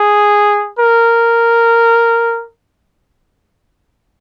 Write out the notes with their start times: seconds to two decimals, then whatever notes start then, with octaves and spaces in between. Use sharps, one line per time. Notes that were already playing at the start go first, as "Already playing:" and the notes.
Already playing: G#4
0.79 A#4